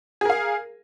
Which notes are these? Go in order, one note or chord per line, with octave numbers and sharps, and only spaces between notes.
G#4 A#4 F5